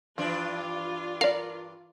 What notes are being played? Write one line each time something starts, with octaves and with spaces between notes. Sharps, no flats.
G2 E3 F3 D4 F4
A#4 D5 F5